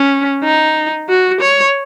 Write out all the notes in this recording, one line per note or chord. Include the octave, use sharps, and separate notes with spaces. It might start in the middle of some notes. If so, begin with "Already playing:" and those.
Already playing: C#4
D#4
F#4
C#5